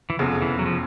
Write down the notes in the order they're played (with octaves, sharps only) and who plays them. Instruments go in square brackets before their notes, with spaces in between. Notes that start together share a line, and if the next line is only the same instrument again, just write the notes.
[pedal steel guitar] E3
[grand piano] F1 E2 C#3 [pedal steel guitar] F3
[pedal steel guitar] E3
F#3
F3